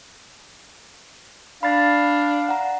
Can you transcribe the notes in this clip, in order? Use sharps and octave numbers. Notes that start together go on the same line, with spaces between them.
D4 F5 B5 A6
F#5 A#5